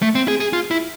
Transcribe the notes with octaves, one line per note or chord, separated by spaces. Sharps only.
A3
C4
G#4
G#4
F4
E4